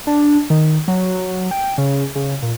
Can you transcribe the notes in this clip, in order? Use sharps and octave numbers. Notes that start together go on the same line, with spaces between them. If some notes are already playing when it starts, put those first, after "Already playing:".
D4
D#3
F#3
G5
C#3
C#3
A#2